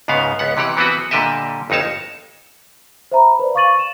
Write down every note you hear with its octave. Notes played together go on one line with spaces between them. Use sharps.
C#2 G#2 C#3 B3 F5
C#2 B3 F#5
C3 E3 G4 F#5
E3 B3 C4 F#4 B4
A#2 D3 G3 G4 D#5 E5
G1 F2 D#4 C#5 A5
C5 E5 A#5 B5
B4 C5 D5
F5 C#6 D6 A6 D#7 F#7
E7